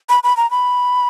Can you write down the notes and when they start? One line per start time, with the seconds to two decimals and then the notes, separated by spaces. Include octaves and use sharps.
0.09 B5
0.23 B5
0.37 A#5
0.51 B5